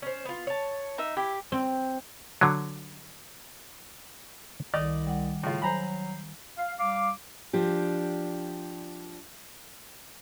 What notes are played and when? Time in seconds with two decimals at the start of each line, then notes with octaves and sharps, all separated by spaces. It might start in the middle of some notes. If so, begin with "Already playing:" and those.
0.02 C#4 C5
0.25 B3 F4
0.47 C#5 A5
0.98 D#4 E5
1.17 E4 G4
1.52 C4
2.41 D3 F#3
4.74 C2 D#3 D5 D#5 D6
5.07 G3 F#5
5.43 A2 C#3 F4
5.62 F#3 C5 G#5 A#5 B5
6.58 F5
6.80 G3 F5 D6
7.53 F3 D4 G4